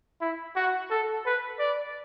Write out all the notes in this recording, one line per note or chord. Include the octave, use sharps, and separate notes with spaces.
E4
F#4
A4
B4
D5